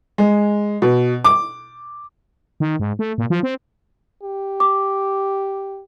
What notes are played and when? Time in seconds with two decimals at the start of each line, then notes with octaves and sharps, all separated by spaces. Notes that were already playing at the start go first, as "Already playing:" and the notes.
0.18 G#3
0.82 B2
1.24 D6
2.60 D#3
2.80 G#2
2.99 A3
3.18 A#2
3.30 F3
3.43 C4
4.23 G4
4.60 D6